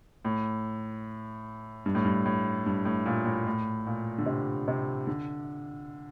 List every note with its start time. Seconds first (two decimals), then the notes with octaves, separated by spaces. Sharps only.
0.25 A2
1.86 G2
1.95 A2
2.05 G2
2.26 A2
2.66 G2
2.85 A2
3.06 A#2
3.25 A2
3.46 A2
3.87 A#2
4.18 D3
4.26 C3
4.68 C3
5.07 D3